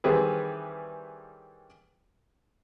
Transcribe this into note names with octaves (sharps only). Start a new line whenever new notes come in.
D#3 E3 G3 C4 G#4 B4